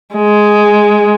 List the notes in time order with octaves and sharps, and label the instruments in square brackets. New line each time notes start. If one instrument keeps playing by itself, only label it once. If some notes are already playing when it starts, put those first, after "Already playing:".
[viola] G#3